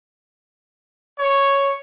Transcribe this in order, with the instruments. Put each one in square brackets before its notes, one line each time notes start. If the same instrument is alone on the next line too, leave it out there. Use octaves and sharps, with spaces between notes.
[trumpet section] C#5